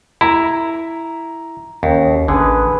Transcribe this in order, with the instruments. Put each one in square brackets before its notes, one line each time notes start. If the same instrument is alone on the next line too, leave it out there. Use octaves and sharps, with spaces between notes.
[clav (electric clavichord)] E4 [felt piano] A#5
[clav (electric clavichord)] D#2 [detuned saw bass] C#4
[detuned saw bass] A1 [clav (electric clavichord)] D3 [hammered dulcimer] G#4 B4